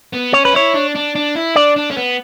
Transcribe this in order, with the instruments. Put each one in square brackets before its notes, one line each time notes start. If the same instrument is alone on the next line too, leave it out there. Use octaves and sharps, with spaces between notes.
[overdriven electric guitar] B3
[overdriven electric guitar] C#4 [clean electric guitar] C#5
[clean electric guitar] B4
[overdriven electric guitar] E4 [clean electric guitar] C#5
[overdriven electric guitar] D4
D4
D4
E4
[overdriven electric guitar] D4 [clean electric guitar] D5
[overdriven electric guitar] D4
C#4
B3